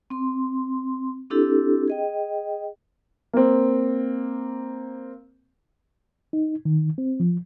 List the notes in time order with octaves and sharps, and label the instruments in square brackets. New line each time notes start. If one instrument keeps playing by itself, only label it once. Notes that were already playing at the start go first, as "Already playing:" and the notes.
[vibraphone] C4 C6
C4 D4 E4 G4 A4
G#4 D#5 G5
[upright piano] A#3 C4
[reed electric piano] D#4
D#3
C4
F3